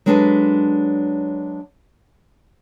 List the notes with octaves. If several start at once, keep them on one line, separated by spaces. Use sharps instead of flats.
F#3 G#3 D4 G#4 A4 B4